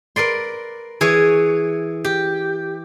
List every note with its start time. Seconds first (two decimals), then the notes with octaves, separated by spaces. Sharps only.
0.16 A#4 B4 D5 C6
1.01 E3 G#4 C#5
2.04 G4